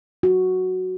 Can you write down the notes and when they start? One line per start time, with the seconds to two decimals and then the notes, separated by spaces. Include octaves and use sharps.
0.23 F#4